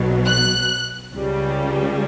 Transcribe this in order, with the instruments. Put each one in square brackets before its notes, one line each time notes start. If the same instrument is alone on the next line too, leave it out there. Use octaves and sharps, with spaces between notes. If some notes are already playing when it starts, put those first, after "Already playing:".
Already playing: [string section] B1 B2 F#3
F#6
C#2 C#3 G3